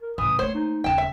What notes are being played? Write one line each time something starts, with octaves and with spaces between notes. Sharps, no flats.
A#4
A2 C#3 E3 D#6
A3 A#3 C5 C#5
D#4
D#1 C#3 G5 A5
E5